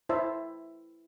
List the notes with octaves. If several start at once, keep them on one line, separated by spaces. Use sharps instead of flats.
E4 C5 E5